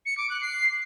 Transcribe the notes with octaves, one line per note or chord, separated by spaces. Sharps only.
C#7
D6
F#6
C7